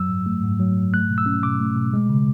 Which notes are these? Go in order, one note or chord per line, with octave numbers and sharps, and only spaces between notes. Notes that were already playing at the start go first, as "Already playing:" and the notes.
Already playing: F#2 F#3 E6
G#2
A3
G#2
F#3
G#2
A3 F#6
B2
E6
C#4
B2 D6
A3
B2
G#3
C#3